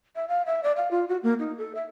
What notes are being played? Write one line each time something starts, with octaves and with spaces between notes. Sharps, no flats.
E5
F5
E5
D5
F5
F4
F#4
A#3
D#4
A4
E5